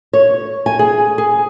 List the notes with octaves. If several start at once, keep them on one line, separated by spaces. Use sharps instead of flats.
C#5
G#5
G#4
G#4